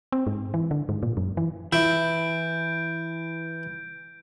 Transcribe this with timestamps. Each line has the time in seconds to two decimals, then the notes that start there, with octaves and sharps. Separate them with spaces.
0.12 C4
0.27 G#2
0.54 E3
0.71 D3
0.89 G#2
1.03 A#2
1.17 F#2
1.37 E3
1.73 E3 E4 G6 D7